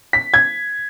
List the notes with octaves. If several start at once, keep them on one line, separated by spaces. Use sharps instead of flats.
B6
G#6